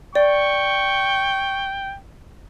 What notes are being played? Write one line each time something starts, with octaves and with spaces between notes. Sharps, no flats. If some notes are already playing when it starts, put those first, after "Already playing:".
D5 G5 C#6